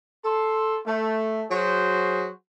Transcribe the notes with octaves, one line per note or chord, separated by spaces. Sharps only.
A4 C6
A3
F#3 F#4 G#4 C5